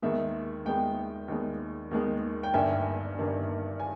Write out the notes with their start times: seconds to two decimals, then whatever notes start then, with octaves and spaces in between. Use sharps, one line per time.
0.02 D#2 D#3 G#3 B3 E5
0.65 D#2 D#3 G#3 B3 G5
1.28 D#2 D#3 G#3 B3
1.91 D#2 D#3 G#3 B3
2.43 G5
2.54 G1 G2 D#3 A#3 E5 G#5
3.18 G1 G2 D#3 A#3
3.80 G#5